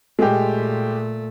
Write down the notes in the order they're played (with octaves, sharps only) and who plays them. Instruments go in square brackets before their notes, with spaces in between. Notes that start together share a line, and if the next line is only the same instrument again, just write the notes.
[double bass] A#2 A3 [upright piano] G#3 G4